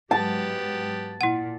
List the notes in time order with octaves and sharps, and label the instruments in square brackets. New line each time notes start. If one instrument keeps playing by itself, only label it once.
[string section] G#2 F#3 [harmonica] B3 G4 [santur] A5
[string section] A#2 [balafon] E4 F#5